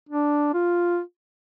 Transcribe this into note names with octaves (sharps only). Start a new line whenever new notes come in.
D4
F4